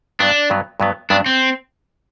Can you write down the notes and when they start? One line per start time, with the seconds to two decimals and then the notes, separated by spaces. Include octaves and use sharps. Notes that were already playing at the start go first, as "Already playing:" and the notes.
0.20 G2 F#3 B3 D4
0.50 G2 F#3 B3
0.80 G2 F#3 B3
1.10 G2 F#3 B3 D4
1.26 C4